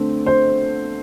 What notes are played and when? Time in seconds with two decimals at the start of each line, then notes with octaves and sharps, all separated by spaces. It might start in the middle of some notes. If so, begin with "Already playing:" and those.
Already playing: D3 A3 C4
0.26 C5